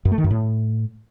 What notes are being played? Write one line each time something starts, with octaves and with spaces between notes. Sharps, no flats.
F#2
A3
D#3
F#2
A2